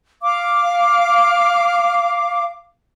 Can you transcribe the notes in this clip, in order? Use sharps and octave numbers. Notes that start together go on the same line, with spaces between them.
F5 D6